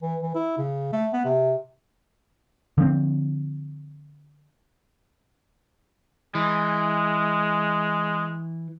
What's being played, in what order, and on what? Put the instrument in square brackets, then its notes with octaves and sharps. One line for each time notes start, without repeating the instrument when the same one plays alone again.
[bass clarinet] E3
E3
E4
C#3
A3
B3
C3
[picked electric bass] D3 F3 B3 C4
[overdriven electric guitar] E3 [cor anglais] G#3